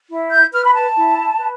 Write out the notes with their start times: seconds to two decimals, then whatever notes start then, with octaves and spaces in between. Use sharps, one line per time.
0.09 E4
0.31 G6
0.52 B4 F6
0.64 B5
0.73 A5
0.95 E4
1.38 B4